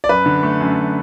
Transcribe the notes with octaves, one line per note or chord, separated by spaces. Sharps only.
D5
F#2 B4
D3
A3
F#2
F#2